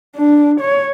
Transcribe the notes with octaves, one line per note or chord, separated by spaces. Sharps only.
D4
C#5